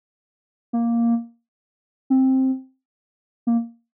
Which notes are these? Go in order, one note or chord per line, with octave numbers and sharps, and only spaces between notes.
A#3
C4
A#3